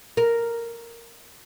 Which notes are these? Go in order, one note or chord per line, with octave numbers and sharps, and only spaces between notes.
A#4